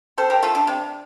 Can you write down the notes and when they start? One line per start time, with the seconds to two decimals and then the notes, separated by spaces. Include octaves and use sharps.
0.18 C3 A4 C5
0.30 G4 A#4
0.42 F3 A3 F4 A4
0.55 D4
0.67 C3